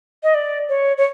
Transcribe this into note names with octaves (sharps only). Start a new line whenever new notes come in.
D#5
D5
C#5
C#5